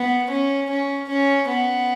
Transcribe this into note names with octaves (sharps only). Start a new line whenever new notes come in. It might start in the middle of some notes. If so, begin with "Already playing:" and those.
Already playing: B3
C#4
C#4
C#4
B3